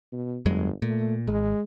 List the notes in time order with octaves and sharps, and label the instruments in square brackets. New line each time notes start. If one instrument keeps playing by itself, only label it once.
[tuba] B2
[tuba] G1 [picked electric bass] F2 F#3 G#3
[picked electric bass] A#2 [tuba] A3
[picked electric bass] G#1 [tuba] G#3